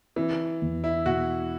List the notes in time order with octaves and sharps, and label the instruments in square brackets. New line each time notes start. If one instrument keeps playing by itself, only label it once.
[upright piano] E3 [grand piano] C4
[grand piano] E2
[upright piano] E4
[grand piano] B2 [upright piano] F#4